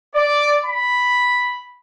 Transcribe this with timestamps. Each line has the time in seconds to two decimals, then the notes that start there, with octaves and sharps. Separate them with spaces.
0.15 D5
0.65 B5